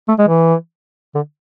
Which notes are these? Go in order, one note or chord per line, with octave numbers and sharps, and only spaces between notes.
A3
G#3
E3
D3